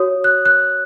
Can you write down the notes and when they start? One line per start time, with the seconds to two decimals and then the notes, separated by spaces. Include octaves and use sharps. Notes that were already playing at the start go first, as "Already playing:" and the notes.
Already playing: F#4 C#5 D#6
0.24 F#6
0.46 F#6